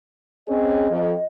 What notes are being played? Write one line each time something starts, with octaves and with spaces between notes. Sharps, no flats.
C4 C#4 G#4 D#5
F2